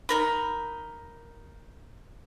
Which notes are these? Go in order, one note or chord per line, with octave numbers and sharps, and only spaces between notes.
D#4 A#4 B5